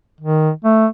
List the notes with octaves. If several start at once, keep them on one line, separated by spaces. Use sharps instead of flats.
D#3
A3